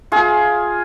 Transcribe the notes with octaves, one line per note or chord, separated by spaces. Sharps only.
F4 G#4